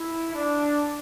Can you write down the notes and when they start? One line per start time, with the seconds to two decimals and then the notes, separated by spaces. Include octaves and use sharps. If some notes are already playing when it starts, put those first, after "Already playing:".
Already playing: E4
0.34 D4